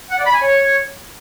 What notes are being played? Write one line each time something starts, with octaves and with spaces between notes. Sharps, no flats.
F#5
D5
B5
G#5
C#5